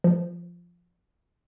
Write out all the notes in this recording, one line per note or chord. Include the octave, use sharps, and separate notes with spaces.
F3